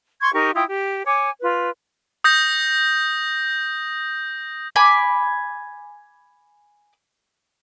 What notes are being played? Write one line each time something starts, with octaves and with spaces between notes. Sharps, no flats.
C6 C#6 G#6
D#4 G4 A#4 C#6
E4 F4 G5 D#6
G4
C#5 G#5 D6
F4 B4
D#6 G6 A#6
G#5 B5 D6